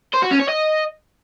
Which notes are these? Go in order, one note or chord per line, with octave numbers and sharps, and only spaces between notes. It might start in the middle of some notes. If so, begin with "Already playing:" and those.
C5
F#4
C#4
C#5
D#5